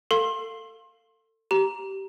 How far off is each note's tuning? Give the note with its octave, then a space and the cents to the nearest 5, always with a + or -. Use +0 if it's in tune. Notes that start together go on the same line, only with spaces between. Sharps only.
A4 +30 F5 +0 C6 +30
G4 -20 A#5 +10